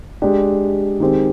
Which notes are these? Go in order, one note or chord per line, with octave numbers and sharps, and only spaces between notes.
G#3 D4 G4
D#3 G#3 C4 G4